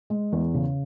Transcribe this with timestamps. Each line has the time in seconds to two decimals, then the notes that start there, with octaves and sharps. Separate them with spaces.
0.10 G#3
0.32 E2
0.54 C#3